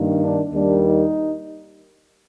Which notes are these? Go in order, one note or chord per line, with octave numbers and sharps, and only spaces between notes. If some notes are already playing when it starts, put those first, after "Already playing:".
Already playing: G2 D#3 A#3
D4
D#2 D#3 G3 A#3 D4
D#4